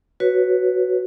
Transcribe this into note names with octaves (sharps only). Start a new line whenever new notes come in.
F#4 B4 C#5